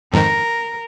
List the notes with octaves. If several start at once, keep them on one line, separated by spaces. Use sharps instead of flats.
F2 G#2 D#3 A#4